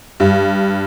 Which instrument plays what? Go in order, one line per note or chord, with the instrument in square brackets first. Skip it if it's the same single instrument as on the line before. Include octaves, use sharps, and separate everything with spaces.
[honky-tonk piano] G2